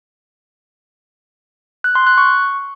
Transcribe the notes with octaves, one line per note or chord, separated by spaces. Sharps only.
F#6
C6
F#6
C#6